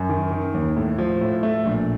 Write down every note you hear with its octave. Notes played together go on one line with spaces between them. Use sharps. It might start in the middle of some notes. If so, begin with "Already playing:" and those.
Already playing: F#2
D#3
D#3
D#2
A2
F3
A2
A3
A#1